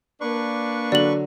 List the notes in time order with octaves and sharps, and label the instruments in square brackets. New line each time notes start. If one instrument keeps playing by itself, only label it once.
[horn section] A#3 D4 [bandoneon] B4 C#6
[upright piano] D3 F#3 [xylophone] D5 F#7